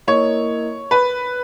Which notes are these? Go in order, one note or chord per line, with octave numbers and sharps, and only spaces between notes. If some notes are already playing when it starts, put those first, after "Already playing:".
A#3 E4 A#4 C#5 D#5
B4